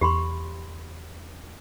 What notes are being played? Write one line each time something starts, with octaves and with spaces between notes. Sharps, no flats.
E2 G4 B5 C6